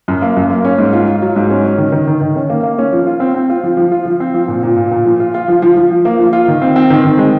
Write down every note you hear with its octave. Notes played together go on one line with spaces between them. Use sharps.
F#2
A#3
F#2
A#3
C#4
G#2
F4
F4
F#3
G#2
C#4
C#4
D#3
D#3
D#3
D#3
C#4
A#3
A#3
C#4
F3
F4
C4
C4
F4
F3
F3
F4
F3
C4
F3
A#2
A#2
A#2
A#2
F3
F4
F4
F3
F3
F3
F3
A#3
F3
F4
D#3
C4
C4
D#3
D#3
G#3